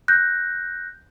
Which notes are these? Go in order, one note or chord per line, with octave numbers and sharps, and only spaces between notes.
F#6 G6 A#6